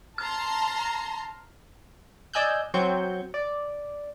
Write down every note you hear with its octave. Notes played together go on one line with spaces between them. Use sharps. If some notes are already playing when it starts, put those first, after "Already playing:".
A5 A#5 C6 F6
D5 D#5 G#5 E6 F#6 G6
F#3 C4 C#6 G6
D5